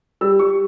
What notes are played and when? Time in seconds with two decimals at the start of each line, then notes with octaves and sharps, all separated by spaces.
0.21 G3 E6
0.39 G3 C#6